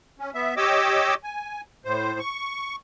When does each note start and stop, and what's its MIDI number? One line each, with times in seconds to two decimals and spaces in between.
0.19 0.31 61
0.34 0.55 59
0.34 0.55 76
0.57 1.14 67
0.57 1.14 73
0.57 1.14 75
0.57 1.14 86
0.57 1.14 88
1.24 1.61 80
1.85 2.19 45
1.85 2.19 72
2.19 2.76 85